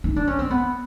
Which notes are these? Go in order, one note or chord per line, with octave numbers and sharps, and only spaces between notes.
D#4
D4
C#4
C4
B3